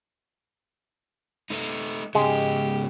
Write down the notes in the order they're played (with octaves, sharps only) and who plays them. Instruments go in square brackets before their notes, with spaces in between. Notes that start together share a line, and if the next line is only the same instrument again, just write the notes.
[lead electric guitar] A3 D#4
[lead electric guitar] G#2 C#3 [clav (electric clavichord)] G#3 [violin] G4